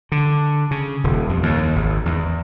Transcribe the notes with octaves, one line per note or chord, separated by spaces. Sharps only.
D3
C#3
D#1
F2
D#2
G#1
E2